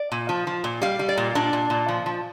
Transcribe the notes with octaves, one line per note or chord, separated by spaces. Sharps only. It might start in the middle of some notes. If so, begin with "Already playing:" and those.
Already playing: D5
A#2
F3
F3
A#2
G3 F5
G3
D5
A#2
A#2 D4
A#2
A#2
F3
F3